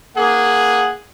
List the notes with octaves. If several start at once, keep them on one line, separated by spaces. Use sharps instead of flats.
A#3 G#4 F#5